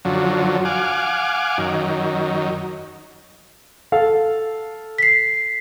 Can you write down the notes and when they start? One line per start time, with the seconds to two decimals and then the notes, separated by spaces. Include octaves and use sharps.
0.05 F#2 D3 F3 F#3
0.65 F5 F#5 G#5 D6
1.58 F#2 D#3
3.92 A4 F5
4.98 B6 C7